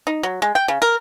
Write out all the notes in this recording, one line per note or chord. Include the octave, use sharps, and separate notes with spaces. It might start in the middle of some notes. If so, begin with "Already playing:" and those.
D#4
F#3
G#3
G5
C#3
A#4